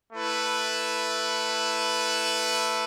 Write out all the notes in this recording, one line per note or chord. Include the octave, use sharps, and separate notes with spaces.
A3 E4 B4